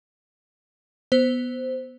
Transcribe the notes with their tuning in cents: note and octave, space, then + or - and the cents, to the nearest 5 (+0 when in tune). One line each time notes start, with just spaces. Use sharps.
B3 +0 C5 -10